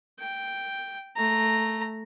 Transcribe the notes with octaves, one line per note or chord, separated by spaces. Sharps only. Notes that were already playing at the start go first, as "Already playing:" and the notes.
G5
A3 A#5